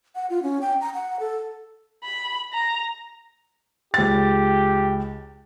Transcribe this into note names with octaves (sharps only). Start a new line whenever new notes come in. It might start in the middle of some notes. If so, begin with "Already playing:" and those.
F#5
F4
C#4
G5
A#5
F#5
A4
B5
A#5
C#2 G4 A6